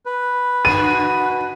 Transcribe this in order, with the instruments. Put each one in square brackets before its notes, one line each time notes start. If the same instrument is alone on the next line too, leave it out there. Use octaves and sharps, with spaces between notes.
[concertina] B4
[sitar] B2 D3 F#4 [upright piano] D#7